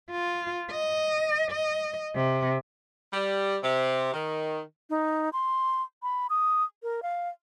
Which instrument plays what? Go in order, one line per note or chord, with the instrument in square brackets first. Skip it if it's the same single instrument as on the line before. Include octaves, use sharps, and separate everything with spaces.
[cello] F4
D#5
D#5
C3
[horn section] G3
C3
D#3
[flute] D#4
C6
B5
D#6
A#4
F5